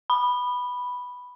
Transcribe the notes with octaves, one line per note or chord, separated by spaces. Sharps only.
B5